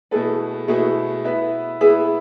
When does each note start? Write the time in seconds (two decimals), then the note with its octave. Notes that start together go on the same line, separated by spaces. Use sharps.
0.11 B2 A3 E4 G#4 A4 B4
0.68 B2 A3 E4 F#4 G#4 B4
1.24 B3 E4 B4 E5
1.81 B3 E4 G#4 B4 E5